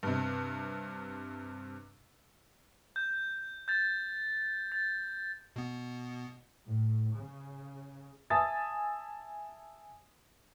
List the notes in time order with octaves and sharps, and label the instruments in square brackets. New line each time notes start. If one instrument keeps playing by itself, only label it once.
[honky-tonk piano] G2 C3
[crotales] G6
G6 A6
A6
[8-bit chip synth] B2 B3
[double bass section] A2
C#3
[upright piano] E5 G#5 A5 D#6 A6